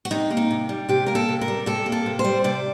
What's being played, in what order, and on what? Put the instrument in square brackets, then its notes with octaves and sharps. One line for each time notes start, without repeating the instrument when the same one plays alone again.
[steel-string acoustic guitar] F#4
C3 D#4
A#3
D#4
C3
G3
C3 G4
A#3 A#4
A4
C3
A#4
G3
C3 A4
A#3
A4
C3
C5
G3
C3 D5